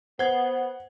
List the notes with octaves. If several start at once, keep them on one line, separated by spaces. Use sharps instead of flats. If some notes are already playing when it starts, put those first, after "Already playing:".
B3 C5 F#5 G#6